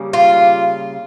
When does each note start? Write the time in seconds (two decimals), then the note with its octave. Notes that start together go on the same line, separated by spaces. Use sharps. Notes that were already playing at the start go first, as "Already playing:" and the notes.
Already playing: C#3 G3 A#3
0.13 F4